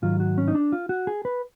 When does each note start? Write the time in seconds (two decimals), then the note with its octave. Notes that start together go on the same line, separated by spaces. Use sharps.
0.02 G#2 D#3 F#3 F4
0.20 F#4
0.38 C#4
0.48 D#4
0.55 D4
0.72 F4
0.89 F#4
1.07 G#4
1.25 B4